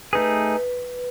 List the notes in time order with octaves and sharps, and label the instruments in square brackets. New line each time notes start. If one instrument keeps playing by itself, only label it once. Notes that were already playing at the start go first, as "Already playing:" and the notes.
[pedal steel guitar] A3 D#4 G#4 [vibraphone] B4